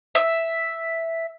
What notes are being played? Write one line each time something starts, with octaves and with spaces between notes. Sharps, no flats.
E5